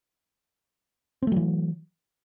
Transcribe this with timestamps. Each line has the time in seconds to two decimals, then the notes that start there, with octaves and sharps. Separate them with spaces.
1.22 C4
1.27 A3
1.32 F#3
1.36 E3